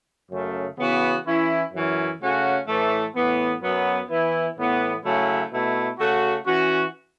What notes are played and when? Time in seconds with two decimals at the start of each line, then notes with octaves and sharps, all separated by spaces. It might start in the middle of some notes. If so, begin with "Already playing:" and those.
0.30 F#2 C#3 A3
0.77 C#3 E3 B3 F#4
1.25 E3 C#4 E4
1.72 F#2 E3 C#4
2.20 C#3 A3 C#4 F#4
2.67 A2 E3 A3
3.15 A2 E3 B3
3.62 F#2 F#3 B3
4.09 E3 B3 E4
4.57 A2 E3 B3
5.04 C#3 F#3 A3 C#4 E4
5.51 B2 A3 E4
5.99 C#3 A3 F#4
6.46 E3 C#4 F#4